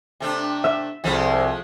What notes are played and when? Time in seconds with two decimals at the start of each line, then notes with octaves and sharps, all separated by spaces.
0.20 C3 A3 D4
0.64 E5 E6
1.04 C2 F3 G#3 A3